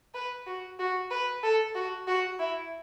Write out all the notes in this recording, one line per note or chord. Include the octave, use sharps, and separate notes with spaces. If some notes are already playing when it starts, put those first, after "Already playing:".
B4
F#4
F#4
B4
A4
F#4
F#4
E4